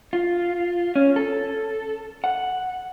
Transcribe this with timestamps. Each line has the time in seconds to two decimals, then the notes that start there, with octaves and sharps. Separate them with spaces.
0.13 F4
0.96 C#4
1.16 A4
2.24 F#5